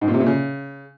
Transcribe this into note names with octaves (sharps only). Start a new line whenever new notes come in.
G#2
A#2
C3
A#2
C#3